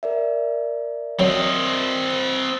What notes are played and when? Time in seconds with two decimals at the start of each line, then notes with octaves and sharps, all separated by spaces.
0.03 A#4 D5 E5
1.19 F#3 C4 D#5